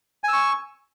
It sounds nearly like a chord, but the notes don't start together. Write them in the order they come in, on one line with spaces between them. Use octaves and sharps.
G#5 E6 C#6